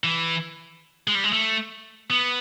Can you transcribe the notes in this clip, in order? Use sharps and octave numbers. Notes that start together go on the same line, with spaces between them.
E3
G#3
G3
G#3
A3
B3